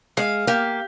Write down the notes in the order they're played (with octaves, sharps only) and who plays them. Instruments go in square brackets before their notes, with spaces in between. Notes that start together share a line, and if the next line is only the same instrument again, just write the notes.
[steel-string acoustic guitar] G#3 [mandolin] F5
[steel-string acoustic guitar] A#3 [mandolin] G4